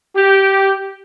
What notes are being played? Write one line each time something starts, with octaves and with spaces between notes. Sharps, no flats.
G4